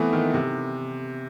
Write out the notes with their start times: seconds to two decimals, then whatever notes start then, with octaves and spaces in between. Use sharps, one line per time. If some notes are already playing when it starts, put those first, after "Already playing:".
Already playing: E3 A3 B3 C4
0.13 D#3
0.34 C3